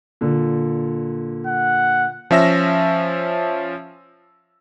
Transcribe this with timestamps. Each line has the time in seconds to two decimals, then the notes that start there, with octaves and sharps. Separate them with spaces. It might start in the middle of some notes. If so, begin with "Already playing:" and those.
0.21 A#2 D3
1.47 F#5
2.31 F3 C#4 E5 E6 A#6